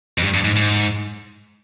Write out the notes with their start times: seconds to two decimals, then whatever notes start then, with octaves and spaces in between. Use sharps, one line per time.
0.18 F2
0.23 G2
0.34 G2
0.45 G#2
0.56 G#2